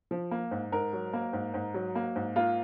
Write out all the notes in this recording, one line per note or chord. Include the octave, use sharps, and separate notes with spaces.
F3
A#3
G#2
G#2 A#4
F#3
A#3
G#2
G#2
F#3
A#3
G#2
A#3 F4